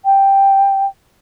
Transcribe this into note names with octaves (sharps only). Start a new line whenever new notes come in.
G5